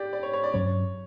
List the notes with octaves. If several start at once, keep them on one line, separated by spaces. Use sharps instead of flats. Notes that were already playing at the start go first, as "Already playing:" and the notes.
Already playing: G4 D5
D5
C#5
C#5
D5
G2 F#3 C#4 C#5